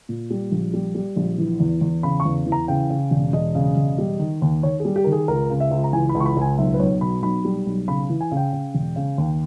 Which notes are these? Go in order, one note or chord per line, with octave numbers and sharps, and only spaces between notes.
A#2
G3
A#1
G3
G3
A#1
E3
E2
E2
C#3 B5
C#6
E2
E3
A#5
C#3 G5
C#3
E1
E1 D#5
C#3
E1
G3
D#3
D#2
D#3 C#5
G#4
G3
G4
D#3 A#4
G#4
C#2 A#4
C#3
E5
C#2
A#5
E3 G#5
B5
C#2
C#6
B5
C#2 G#5
B1 E5
B4
B1 C#5
B2 B5
B1 B5
G3
B1
C#3 B5
E3
G#5
C#3
G5
C#3
E1
C#3
D#2